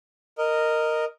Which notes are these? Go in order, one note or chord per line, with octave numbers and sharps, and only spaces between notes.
A#4 D#5